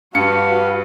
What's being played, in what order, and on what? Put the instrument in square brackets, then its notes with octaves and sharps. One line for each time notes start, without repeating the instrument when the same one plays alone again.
[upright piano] G2 C#7 [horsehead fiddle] F#4 B4 [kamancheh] G4 [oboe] F5